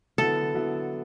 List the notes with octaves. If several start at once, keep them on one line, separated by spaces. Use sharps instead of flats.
D3 F#3 B3 E4 A4
D3 F#3 B3 E4